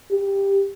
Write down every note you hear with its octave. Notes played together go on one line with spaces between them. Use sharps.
G4